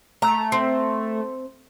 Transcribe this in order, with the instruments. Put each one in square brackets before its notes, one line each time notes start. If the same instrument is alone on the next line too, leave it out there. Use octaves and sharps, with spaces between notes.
[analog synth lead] A3 [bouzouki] A#5
[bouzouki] C4